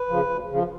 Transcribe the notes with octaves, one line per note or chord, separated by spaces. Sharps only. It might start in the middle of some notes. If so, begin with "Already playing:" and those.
Already playing: B4
C#3 F3
D2
C#3 F3